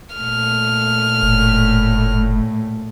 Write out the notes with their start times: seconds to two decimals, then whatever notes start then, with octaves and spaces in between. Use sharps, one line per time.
0.16 A#2 A3 F6
1.23 F#1 A2